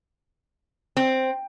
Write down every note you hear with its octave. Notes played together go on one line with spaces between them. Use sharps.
C4